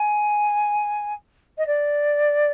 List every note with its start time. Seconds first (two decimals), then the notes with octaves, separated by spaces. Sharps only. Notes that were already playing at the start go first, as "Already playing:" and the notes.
Already playing: G#5
1.58 D#5
1.67 D5